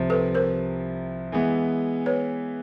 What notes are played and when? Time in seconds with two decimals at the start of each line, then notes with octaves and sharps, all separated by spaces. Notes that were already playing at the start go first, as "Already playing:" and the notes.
Already playing: C2 C3 F3
0.10 A4 B4
0.35 A#4 C5
1.32 E3 G#3 B3
2.06 B4 C#5